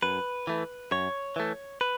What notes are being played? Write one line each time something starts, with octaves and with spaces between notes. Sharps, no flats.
F#2 B4
E3 A3
F#2 C#5
E3 A3
B4